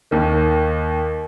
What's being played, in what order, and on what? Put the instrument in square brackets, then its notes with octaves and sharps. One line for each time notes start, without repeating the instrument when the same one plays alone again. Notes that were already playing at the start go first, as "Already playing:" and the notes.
[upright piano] D#2 D#3